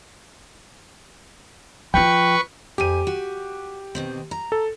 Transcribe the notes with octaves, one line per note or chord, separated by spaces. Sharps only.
F3 F4 B4 G5 C#6
F2 G4 G#5 D#7
F#4
B2 D#3 C4
A#5
A4